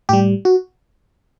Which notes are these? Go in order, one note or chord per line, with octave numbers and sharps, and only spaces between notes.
A2 G3 G4
F#4